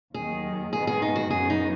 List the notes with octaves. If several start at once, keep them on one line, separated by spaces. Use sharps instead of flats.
D#2 D#3 F#3 G#4
G#2 D#3 B3 G#4
G#4
D#4
F#4
F#2 C#3 B3 F#4 G#4
D#4